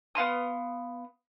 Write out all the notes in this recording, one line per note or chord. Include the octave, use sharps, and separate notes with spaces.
B3 F5 C6 D#6